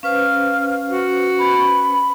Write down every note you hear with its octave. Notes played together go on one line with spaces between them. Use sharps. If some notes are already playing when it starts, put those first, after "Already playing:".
C#4 B4 C5 F5
F#4
B5